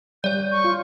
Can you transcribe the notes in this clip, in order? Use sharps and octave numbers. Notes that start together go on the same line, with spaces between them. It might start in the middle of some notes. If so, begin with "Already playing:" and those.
G3 C#5 D5 G6
C#6
F4